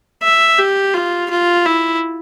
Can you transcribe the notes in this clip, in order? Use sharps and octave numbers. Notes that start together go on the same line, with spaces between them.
E5
G4
F4
F4
E4